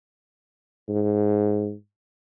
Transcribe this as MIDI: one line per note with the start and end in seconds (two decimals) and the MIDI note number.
0.89 1.73 44